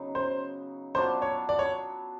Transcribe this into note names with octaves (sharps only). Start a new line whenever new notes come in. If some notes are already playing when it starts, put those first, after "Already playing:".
Already playing: C#3 F#3 B3 D#4
C5
F#3 B3 D4 F4 C5
C#5
D5
C#5